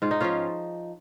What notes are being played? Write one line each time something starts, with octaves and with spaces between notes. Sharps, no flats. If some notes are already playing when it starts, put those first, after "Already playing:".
G#2 F4
D#4
F3 C#4 F4